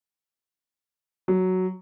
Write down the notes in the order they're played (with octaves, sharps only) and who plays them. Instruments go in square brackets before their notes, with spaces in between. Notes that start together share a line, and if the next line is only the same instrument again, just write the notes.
[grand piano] F#3